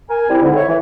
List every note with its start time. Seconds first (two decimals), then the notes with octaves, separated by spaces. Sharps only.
0.10 A#4 G#5
0.29 G3 C4 E4
0.43 G#2 D3
0.56 E4 C#5
0.68 E3